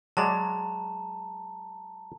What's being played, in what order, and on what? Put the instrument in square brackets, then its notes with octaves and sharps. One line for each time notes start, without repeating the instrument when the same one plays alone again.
[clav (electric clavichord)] F#3 G#3 D5 [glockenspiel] A5 A#5